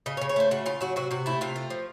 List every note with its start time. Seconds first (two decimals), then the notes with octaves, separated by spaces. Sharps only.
0.06 C#3 D#5
0.17 C#5
0.21 C#3
0.29 C#5
0.36 A3 C5
0.51 C#3 F#4
0.66 C#3 F4
0.81 F#3 F#4
0.96 C3 F#4
1.11 C3 F#4
1.26 A3 E4
1.41 C3 F4
1.56 A3
1.70 F3